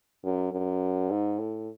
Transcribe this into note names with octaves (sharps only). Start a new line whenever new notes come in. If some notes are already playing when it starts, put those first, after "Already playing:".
F#2
F#2
G#2
A2